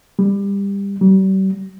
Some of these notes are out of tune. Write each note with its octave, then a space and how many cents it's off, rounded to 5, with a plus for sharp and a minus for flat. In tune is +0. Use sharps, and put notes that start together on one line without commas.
G3 +25
G3 -40